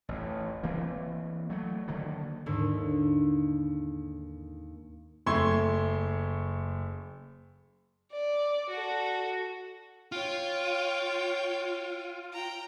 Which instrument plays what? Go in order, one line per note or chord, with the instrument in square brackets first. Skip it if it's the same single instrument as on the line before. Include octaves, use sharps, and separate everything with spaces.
[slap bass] A1 F2
E3 A#3 C4
F#3 A3
D3 D#3 F#3 A#3
[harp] D#2 G#2 D3
[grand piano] F#1 A3 C6 C#6 E6 G#6
[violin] D5
F#4 A4
[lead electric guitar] F4 [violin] C#5 G5
[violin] G5 A#5